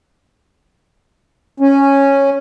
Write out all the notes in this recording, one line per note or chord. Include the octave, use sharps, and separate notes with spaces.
C#4